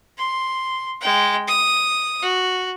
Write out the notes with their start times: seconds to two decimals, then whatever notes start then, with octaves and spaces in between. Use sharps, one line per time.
0.18 C6
1.01 G#3 G5
1.48 D#6
2.22 F#4